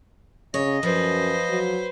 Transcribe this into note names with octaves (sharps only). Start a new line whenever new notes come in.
C#3 C#5 D#5
F#2 F3 B4 C5
F#3